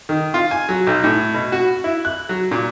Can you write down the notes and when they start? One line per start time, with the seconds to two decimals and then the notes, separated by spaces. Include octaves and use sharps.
0.09 D#3
0.34 F4
0.51 G#5
0.69 F#3
0.87 B1
1.04 A2
1.34 B2
1.52 F#4
1.84 E4
2.05 F#6
2.29 F#3
2.51 A#2